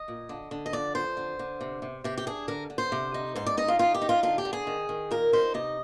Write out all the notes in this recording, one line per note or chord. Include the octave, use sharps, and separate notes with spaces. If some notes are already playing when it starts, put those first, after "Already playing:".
Already playing: D#5
A#2
D3
D3
D#5
F2 D5
F2 C5
D3
D3
C3
C3
C3 G4
G4
D4 G#4
D3 A#4
D3
C5
C3
D#4
G#2 C5
D5
D#4 D#5
F4
D#3 F4
G4
D#4
F4
D3 F4
G4
D3
G#4
D#3
D#3
A#2 A#4
D#4 C5
C3 D#5